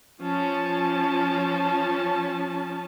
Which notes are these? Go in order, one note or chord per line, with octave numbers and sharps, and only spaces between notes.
F3 C#4 A5